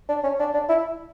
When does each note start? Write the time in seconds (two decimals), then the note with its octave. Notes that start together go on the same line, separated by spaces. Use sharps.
0.09 D4
0.23 C#4
0.39 D4
0.54 D4
0.69 E4